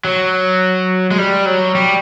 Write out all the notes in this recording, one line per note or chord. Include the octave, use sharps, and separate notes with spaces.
F#3
G#3
G3
F#3
G3